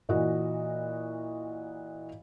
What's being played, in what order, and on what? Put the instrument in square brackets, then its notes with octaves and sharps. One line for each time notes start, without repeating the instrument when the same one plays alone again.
[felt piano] A#2 E3 F#4 D#5